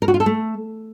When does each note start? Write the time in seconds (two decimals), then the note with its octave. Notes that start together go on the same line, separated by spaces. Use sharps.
0.02 A#4
0.08 F#4
0.14 F4
0.20 A4
0.26 A3